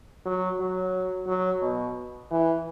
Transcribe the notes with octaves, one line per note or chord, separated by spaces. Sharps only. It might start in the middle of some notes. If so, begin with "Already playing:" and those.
F#3
F#3
F#3
B2
E3